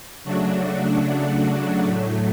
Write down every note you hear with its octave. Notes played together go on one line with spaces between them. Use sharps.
C#3 F#3 A3 D4 F#4
A2 F#3 A3